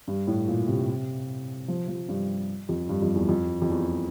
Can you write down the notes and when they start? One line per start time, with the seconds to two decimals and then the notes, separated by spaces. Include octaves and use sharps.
0.08 G2
0.27 A2
0.48 A#2
0.68 C3
1.68 F3
1.88 F3
2.09 G2
2.69 F2
2.89 G2
3.02 F2
3.15 E2
3.29 F2
3.62 F2
3.70 E2